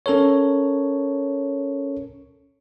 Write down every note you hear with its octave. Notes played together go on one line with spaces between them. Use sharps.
C#4 A4 A#4 C#5